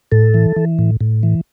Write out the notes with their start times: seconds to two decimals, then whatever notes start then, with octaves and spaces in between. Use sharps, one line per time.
0.12 A2 A4
0.34 E3
0.56 E3
0.79 A2
1.01 A2
1.23 E3